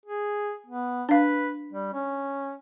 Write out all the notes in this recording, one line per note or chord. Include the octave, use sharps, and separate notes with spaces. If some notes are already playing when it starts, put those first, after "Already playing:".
G#4
B3
D4 B4 F5
G3
C#4